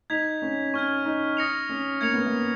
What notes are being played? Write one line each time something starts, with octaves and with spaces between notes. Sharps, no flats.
D#4 G#6 B6 F7
C#4
C#4 C#6 F6 G#6
D#4
D#6 A#6 C#7 F7
C#4
A#3 G#6 C#7 F7
B3
A#3